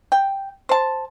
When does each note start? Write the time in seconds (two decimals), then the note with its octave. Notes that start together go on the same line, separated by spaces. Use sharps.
0.12 G5
0.69 C5 A5